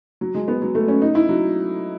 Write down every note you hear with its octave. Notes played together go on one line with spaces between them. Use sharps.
F#3
G#3
B3
F#3
A3
C#4
D#4
E4
F#3